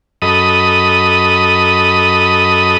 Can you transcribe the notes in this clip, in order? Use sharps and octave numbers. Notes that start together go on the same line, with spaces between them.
F#2 A4 D#5 B5 D#6